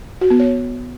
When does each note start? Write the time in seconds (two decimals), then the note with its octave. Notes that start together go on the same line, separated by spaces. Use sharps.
0.21 F#4
0.30 B3
0.40 C#5